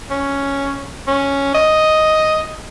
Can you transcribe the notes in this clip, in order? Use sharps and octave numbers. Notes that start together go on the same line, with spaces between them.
C#4
C#4
D#5